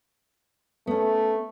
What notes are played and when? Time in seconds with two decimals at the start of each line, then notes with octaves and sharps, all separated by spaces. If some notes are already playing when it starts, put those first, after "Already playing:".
0.87 A3 B3 C#4